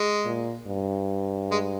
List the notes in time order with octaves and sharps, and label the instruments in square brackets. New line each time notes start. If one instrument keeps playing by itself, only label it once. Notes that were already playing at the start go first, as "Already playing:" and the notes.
Already playing: [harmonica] G#3
[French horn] A#2
G2
[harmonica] G#3